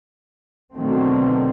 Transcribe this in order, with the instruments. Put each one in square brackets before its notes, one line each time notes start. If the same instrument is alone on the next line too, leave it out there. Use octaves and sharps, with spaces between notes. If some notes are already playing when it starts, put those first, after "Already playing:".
[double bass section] B2 D3 D#3 F#3 A3 C4